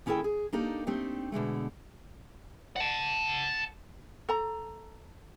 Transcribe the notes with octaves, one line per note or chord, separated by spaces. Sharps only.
D#2 C#4 E4 G#4 A4 G5
G#4
A#3 D4 D#4 G4 A4
A3 C4 D4 D#4 G4
B2 D3 G#3 A3
F#5 A5
A4 A#5